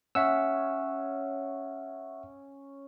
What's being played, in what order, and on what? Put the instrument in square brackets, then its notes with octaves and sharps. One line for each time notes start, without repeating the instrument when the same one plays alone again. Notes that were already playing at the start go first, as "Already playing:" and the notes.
[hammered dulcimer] C#4 [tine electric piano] E5 F#5 E6